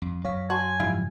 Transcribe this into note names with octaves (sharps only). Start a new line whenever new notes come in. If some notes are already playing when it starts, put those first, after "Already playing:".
F2
F#2 F#3 C#5 F5 B6
F#4 C#5 G#5 A5 C6
G#2 C#3 F3 G3 E4 F5